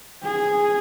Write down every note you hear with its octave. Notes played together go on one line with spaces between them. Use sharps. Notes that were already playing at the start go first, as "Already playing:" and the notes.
G#4